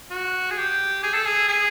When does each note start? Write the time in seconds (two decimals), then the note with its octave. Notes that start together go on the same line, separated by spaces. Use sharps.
0.11 F#4
0.51 G#4
0.58 G4
1.03 G#4
1.14 A4
1.27 G#4
1.49 G#4